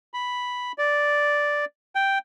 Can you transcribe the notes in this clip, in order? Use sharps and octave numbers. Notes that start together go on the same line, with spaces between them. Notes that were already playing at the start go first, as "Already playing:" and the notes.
B5
D5
G5